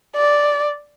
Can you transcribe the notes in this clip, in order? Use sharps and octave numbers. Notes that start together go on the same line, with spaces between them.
D5